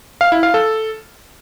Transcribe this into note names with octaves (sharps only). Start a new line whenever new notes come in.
F5
E4
F5
A4